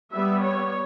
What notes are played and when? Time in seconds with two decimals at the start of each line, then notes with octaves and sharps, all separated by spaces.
0.13 G3 B3 E5
0.43 C#5